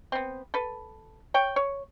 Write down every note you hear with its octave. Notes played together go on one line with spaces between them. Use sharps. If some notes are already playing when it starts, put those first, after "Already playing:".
B3 C4
A4 B4
C#5 G5
C#5